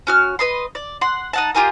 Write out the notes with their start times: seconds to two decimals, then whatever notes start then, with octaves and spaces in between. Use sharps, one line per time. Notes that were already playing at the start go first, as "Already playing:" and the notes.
0.07 C#4 F#4 F6
0.39 B4 D#5 C6
0.75 D5
1.01 F#5 C6
1.33 D#4 F#5 A5
1.55 F4 G4 G#4 A#4